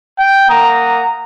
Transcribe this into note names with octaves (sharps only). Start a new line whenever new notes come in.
G5
A#3 F#5 A#5 D#6